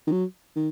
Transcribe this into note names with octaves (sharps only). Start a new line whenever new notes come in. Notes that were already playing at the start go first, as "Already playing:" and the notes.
D#3
F#3
D#3